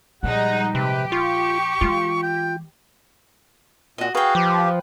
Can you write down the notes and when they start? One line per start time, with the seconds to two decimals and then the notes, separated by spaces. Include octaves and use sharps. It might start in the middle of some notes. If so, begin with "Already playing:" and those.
0.23 A#2 F3 G3 G#3 D#4 F#5
0.75 C3 G4 B4
1.12 F4 C#6
1.81 E3 G#3 F4
2.23 G5
3.98 A#2 F#4 D#5
4.15 F#4 G#4 B4 F5 G5
4.35 F3 G4